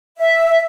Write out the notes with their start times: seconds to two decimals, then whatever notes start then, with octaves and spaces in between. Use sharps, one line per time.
0.17 E5